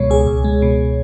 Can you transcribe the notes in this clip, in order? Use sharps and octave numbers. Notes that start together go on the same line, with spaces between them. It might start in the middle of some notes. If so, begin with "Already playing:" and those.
Already playing: C#2 B2 G#3 C#5
C#2 G#4
C#2
G#3
B2